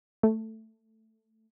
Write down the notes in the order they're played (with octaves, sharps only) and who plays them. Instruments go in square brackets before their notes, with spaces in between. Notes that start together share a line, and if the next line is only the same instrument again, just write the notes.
[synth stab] A3